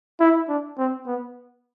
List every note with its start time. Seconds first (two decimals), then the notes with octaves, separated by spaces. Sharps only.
0.21 E4
0.49 D4
0.78 C4
1.07 B3